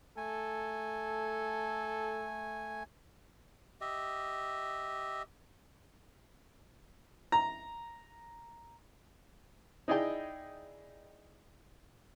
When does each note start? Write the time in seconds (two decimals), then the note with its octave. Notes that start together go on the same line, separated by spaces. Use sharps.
0.17 A3 A4 G#5
3.81 G4 D#5 E5
7.32 A#5
9.88 D#4 E4 G#4 D5 D#5 G5